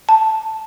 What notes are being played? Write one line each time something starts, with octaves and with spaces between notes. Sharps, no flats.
A5